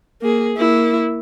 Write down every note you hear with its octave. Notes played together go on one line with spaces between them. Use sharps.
A#3 G#4
A#3 E4